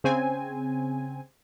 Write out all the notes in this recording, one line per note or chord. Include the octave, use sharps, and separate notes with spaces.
C#3 C4 G#5